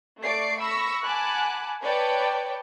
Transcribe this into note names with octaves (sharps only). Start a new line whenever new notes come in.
A3 D5 C#6 C7 D7
B5 C#6 E6 A#6
F#5 G#5 A5 B5 D6 F#6
B4 C#5 D5 G5 A5